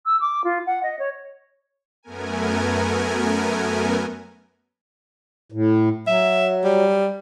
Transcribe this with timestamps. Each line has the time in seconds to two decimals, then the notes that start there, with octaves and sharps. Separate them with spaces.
0.05 E6
0.20 D6
0.44 F4
0.66 F#5
0.83 D#5
0.99 C#5
2.03 F#2 A3 B3 A#4 G#5
5.52 A2
6.07 F#3 E5
6.64 G3